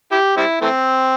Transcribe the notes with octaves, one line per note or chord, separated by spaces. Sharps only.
E4 G4
G3 C4 E4
E3 A3 C4